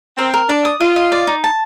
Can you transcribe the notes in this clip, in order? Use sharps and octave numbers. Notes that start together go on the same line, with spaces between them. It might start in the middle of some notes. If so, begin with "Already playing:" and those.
C4 A#4
A#4
D4 D5
D#6
F4 D#5
D#5
D5
D#4
A5